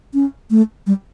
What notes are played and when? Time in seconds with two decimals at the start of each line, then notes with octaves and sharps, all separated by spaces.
0.14 C#4
0.50 A3
0.87 G3